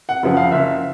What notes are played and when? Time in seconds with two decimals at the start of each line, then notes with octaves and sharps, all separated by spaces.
0.09 F#5
0.23 F#2 C#3 F3 F#5
0.37 F5
0.51 F#1 E5